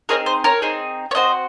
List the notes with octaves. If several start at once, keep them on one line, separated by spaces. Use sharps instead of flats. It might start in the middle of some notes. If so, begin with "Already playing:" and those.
C4 D#4 G#4 A#4 C#5
C5
A#4 C#5
C4 D#4 G#4
C#5
C4 F#4 C5 D#5